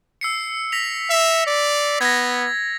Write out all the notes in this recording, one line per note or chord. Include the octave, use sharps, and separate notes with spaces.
E6 C7 C#7
A#6 B6 F7
E5
D5
B3 G#6 A#6